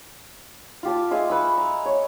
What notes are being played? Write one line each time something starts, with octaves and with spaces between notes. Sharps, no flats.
F4 G4 A5
G#3 F4 E5 G#5
B4 G#5 C#6 E6
A#5
C#5